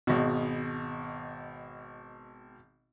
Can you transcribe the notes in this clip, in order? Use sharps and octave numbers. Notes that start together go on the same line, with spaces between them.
G#1 B2